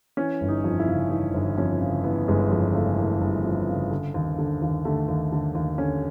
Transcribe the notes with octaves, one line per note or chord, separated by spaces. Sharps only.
E3 C#4
G1
D#4
F2
E4
C#3
E3 D#4
G1
F2 C#4
C#3
E3 B3
G1 G#3
F2 G#3
C#3 A3
E3 A#3
G1
F2
C#3
D3
D#2
D3
D#2
D3 A3
D#2
D3
D#2
D3 C#4